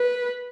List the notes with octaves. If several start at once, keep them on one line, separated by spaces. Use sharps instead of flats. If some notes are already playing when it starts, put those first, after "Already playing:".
Already playing: B4